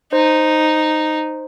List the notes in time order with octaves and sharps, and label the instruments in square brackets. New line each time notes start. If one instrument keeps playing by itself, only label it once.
[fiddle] D#4 [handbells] C5